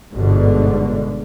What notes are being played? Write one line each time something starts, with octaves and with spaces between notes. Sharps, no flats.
G1 G#2 B2 D3